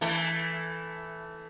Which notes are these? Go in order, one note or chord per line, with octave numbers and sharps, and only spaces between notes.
E3 A3